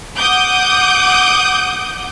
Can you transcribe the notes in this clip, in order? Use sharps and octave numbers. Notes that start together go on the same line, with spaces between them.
F#5 D6 D#6 G6